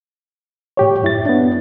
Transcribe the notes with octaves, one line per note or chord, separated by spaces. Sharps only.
A2 G4 C#5
F#2 E4 A6
B3 D4